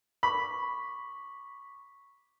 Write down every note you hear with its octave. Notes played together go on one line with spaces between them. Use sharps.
B5 C#6 D6 B6